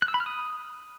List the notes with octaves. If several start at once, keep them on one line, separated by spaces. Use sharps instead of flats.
F#6
E6
B5
F6
D#6